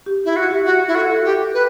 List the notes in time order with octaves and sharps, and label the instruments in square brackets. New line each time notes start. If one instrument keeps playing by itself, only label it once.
[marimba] G4
[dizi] E4
F#4
[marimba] G4
[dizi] F#4
E4
[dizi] F#4 [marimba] A4
[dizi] G4
B4